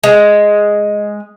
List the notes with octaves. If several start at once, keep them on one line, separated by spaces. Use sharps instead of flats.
G#3